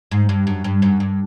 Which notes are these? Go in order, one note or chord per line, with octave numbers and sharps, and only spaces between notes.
G#2
G2
F#2
G2
F#2
G2